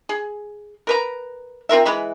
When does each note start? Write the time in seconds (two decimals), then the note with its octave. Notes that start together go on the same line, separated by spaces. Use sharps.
0.09 G#4
0.87 A#4 B4 A#5
1.69 C4 F4 A#4 E5
1.85 E3 G#3 B5